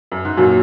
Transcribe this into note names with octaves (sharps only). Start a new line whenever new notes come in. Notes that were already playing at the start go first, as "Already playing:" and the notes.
F#2
G#2
F#2 A#2 F#3